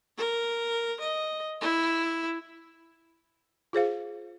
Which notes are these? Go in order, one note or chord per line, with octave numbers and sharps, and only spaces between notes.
A#4
D#5
E4
F4 G#4 C5 F5